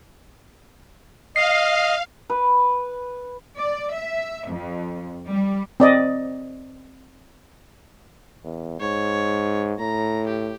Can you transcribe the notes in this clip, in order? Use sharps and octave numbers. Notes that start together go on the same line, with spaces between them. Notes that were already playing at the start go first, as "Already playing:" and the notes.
D#5 F5 C7
B4
D5
E5
F2
G3
C4 D5 D#5
E2
G#2 C#5
A2 A#5
G4